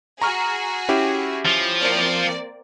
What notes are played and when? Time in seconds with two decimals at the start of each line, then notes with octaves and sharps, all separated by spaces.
0.22 F#4 G#4 A#5 C#6 F6
0.89 C#4 E4 G4
1.45 F3
1.81 A#3 C4 D5